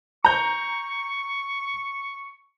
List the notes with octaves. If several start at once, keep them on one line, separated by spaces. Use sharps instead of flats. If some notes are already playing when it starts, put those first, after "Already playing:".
A#5 C#6 G6